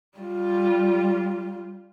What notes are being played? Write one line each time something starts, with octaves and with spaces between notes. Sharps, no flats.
G3 F4